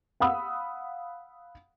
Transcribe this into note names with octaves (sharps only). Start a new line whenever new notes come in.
F5 F#5 B5 D#6 E6